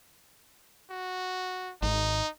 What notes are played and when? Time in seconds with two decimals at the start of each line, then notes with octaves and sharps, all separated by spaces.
0.90 F#4
1.82 G#1 D#4